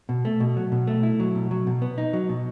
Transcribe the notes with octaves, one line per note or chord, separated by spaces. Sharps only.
B2
A3
B2
F#3
B2
A3
E4
F#3
B2
F#3
B2
B3
D#4
F#3
B2